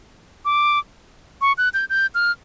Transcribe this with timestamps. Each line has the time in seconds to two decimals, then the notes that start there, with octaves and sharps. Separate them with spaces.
0.45 D6
1.41 C#6
1.58 F#6
1.74 G6
1.90 G6
2.15 F6